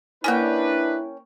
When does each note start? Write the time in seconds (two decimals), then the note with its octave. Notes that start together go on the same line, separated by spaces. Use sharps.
0.24 A#3 C#4 D4 E4 A#4 B4 G5 G#5